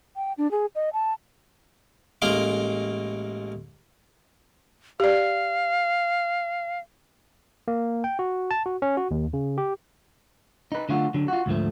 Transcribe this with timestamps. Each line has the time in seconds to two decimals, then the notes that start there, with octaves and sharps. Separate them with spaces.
0.16 G5
0.38 D4
0.51 G#4
0.75 D#5
0.93 A5
2.22 A1 G#3 A#3 F5 C6 D6
5.00 G4 D5 F5
7.68 A#3
8.04 G5
8.19 F#4
8.51 A5
8.66 F#4
8.82 C#4
8.97 F#4
9.11 D#2
9.33 C#3
9.58 G4
10.72 D#4 B4
10.89 D3 F#3 A3 F4 F#4
11.14 D3 F#3
11.28 F4 F#4
11.46 D2 G#2 F3 A3